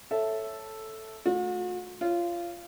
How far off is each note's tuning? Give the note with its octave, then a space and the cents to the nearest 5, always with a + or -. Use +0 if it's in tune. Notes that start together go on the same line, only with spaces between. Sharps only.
A4 +0 C#5 -10 E5 +0
A3 -20 F#4 -45
F4 -20 C#5 +0